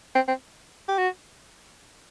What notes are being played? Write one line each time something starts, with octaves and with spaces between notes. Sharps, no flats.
C4
C4
G4
F#4